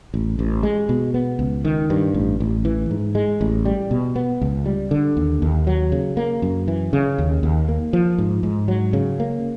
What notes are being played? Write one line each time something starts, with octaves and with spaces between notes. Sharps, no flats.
A1
A1
G#3
B2
B3
C#2
D#3
G2
A1
A1
E3
G#2
G#3
A1
G3
B2
B3
C#2
G3
D3
D#2
D#2
F#3
C#3
A#3
F#2
E3
C#3
D#2
D#2
A#3
F3
G#2
G#2
F#3
C#3
A#3